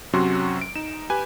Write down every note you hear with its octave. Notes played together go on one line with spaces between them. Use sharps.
F#2 C3 F#3 C#4 F#4 C6
D7
D#4 E7
G4 B4 G#5